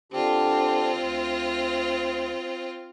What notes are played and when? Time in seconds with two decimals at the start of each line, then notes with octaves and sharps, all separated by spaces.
0.12 D3 C4 D4 F4 G4
0.97 D2